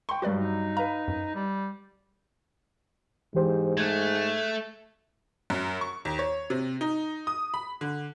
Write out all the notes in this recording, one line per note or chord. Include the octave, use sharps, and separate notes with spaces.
G5 C6 C#6
G2 F#3 F#4 B4 D5
D#4
B4 F5 A#5
F#2
G3
G#2 E3 G4 C5
A3 F#6 G#6
F#2
C#6
D#2
C#5
C3
D#4
D#6
B5
D3